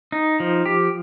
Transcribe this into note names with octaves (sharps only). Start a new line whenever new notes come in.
D#4
F3
G4